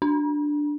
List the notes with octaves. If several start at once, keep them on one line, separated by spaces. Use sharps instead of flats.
D4